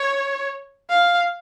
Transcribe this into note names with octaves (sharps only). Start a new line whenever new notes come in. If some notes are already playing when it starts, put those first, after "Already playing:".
Already playing: C#5
F5